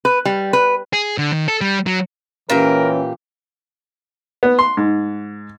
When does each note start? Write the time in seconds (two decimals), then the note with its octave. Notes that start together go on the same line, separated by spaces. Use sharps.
0.05 B4
0.25 G3
0.53 B4
0.93 G#4
1.18 D3
1.33 D#3
1.48 A4
1.61 G3
1.86 F#3
2.50 A#2 E3 C#4 G4 A#4
4.43 B3
4.59 C6
4.77 G#2